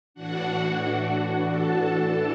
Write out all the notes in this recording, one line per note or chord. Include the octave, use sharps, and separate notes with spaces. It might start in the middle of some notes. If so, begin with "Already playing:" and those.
A2 E3 D4 F#4 F#5
F#4 F#5
F#4 F#5
A4 A5
E3 D4 A4 A5